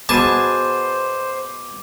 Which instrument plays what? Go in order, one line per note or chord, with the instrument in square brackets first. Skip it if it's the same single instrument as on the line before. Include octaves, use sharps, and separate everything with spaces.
[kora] B2 B3 G#4 [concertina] C5 [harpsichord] A5 [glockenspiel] D6 D#7